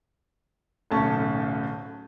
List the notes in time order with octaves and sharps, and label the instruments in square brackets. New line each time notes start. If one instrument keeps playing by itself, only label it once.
[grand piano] D1 B1 A3 C#4 A5